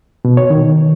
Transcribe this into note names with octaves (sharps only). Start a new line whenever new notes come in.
B2
C#5
D#3